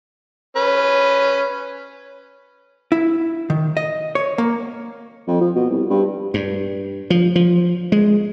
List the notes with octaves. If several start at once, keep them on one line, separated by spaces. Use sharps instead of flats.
C#4 B4
E4
D#3
D#5
C#5
A#3
F2
F3
B2
C2
G2
G2
F3
F3
G#3